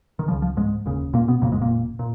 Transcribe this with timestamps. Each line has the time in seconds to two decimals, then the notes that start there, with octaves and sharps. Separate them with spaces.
0.19 D#3
0.28 C#3 F3
0.31 C#2
0.42 F3
0.57 G#2 G#3
0.86 F1 D#2 C#3
1.14 A#2 A#3
1.28 B2 B3
1.42 F#1 F2 A#2 C#3 A#3
1.51 G#2 G#3
1.62 A#2 A#3
1.99 A#2